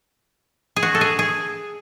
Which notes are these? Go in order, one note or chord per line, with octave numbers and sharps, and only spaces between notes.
G#4
F#4
A4
G#4
G#4